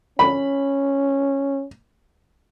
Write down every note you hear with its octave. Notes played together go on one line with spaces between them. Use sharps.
C#4 B5